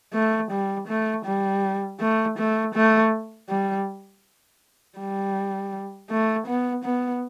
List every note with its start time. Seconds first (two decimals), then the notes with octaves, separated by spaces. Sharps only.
0.14 A3
0.51 G3
0.88 A3
1.25 G3
2.00 A3
2.38 A3
2.75 A3
3.49 G3
4.99 G3
6.10 A3
6.47 B3
6.85 B3